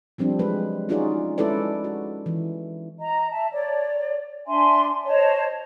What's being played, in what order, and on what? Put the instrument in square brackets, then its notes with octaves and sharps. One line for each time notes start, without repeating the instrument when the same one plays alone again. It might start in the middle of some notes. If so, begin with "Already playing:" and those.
[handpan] F3 G3 C4 D4
F#3 G#3 B4
C#4 D#4 F4 F#4 G#4 D5
G#3 C#4 E4 A4 B4 D5
F#4
E3
[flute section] D#5 A#5
E5 A5
C#5 D5
D4 E5 G#5 C6
C5 C#5 D#5 A5